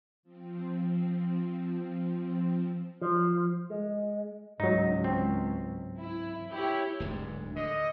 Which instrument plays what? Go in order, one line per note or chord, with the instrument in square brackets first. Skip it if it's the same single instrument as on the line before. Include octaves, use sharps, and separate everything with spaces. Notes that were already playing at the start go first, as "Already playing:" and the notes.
[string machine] F3 C4
[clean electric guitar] F3
G#3
[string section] C#2 [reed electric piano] G#2 F#3 [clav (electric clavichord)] D#4
[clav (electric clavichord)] C4
[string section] E4
E4 G4 C#5
[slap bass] D1 D2 G#2
[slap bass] D3 [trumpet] D#5